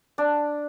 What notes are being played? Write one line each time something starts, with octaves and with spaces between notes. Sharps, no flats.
D4